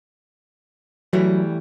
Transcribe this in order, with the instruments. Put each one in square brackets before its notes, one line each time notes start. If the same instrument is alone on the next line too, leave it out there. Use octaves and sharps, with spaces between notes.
[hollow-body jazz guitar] E3 G3 A3 [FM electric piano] F#3